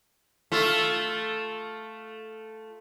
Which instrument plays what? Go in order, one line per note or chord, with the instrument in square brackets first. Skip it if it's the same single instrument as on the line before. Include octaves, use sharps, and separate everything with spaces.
[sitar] A3 F4